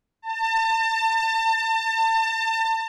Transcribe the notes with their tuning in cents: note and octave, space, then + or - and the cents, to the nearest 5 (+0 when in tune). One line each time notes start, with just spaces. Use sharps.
A5 +35